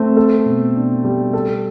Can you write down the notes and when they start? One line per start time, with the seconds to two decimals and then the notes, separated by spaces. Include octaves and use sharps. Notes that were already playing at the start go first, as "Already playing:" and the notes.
Already playing: A3 C4
0.17 A4
0.46 B2
0.75 D4
1.04 G3
1.33 A4